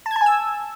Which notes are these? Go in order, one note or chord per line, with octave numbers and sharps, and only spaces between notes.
A5
G#6
A5
G#5
E6